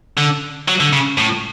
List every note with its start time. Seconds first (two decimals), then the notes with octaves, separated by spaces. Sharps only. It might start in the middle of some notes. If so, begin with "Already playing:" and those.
0.18 D3
0.68 F#3
0.80 D3
0.93 C#3
1.18 A2